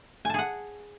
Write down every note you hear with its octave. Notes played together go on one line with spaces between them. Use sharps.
G#4 F#5 G#5 A5